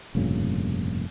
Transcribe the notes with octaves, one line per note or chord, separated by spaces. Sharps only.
F1 G2 A#2 C#3